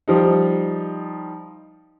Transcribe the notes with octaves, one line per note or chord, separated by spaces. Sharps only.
F3 G3 D#4